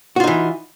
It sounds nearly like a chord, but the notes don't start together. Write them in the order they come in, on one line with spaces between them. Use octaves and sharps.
F#4 F4 D#4 E3